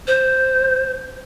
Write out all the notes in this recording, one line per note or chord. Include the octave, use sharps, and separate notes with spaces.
C5